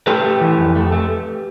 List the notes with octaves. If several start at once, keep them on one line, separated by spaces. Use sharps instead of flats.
A3 G4 B4
A3
E3
F2
A3
A3